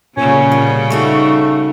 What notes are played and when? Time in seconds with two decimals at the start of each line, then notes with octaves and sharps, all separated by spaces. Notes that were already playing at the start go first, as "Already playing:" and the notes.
0.17 A#2 C#3 G3 C#4
0.52 B2
0.90 A3 D#4 F#4 D#5 C#6